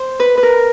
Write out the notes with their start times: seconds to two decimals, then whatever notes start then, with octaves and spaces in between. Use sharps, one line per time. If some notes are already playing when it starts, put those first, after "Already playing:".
Already playing: C5
0.20 B4
0.37 B4
0.43 A#4